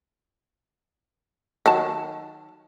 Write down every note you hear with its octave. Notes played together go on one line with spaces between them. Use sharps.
D#3 F#3 A5